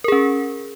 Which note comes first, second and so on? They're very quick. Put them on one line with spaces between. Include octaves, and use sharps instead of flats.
A#4 G#4 C#4